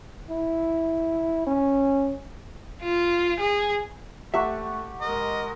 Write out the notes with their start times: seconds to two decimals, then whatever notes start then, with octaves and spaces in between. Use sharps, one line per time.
0.30 E4
1.46 C#4
2.82 F4
3.40 G#4
4.34 A3 G4 E5 F#5 C#6
5.01 G#3 A#4 D#5